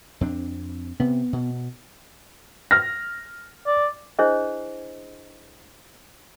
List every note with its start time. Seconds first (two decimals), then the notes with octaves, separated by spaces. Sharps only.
0.21 F2 C4 D4
1.00 C3 B3
1.33 B2
2.71 F6 A#6
3.67 D5
4.19 D4 E4 G#4 C5 C#5 D#5